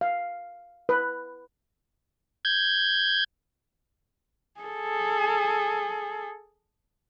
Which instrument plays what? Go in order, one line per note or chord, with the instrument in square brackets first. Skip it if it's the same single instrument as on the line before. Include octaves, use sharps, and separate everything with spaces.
[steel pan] F5
B4
[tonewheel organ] G6 G#6
[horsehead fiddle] G#4 A4